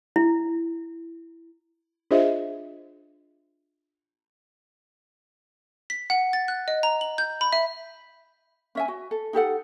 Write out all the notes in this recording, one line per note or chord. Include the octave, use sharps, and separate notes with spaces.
E4
D4 F4 G#4 C5 D#5 E5
B6
F#5
A6
F#6
D#5
A#5
F#7
G6
B5
E5
C#4 E5 G#5
F#4
A4
D#4 G4 A4 F#5